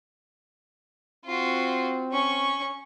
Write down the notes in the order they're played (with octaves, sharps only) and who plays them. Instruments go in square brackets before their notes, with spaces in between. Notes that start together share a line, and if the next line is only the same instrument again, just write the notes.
[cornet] C4 [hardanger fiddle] F4 F#4
[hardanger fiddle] C#4 C#6